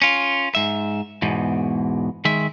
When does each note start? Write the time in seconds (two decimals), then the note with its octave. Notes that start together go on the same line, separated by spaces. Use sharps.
0.02 C#4 F4
0.55 G#2 E5
1.22 E2 G#2 B2
2.25 D#3 G#3 E5